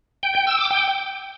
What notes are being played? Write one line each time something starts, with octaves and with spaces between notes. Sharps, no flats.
G5
G5
E6
D6
G5